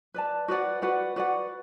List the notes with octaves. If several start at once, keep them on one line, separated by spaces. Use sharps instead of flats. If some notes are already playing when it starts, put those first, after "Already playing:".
B4 D5 A5
F#4 B4 D5 F#5
F#4 B4 D5 F#5
F#4 B4 D5 F#5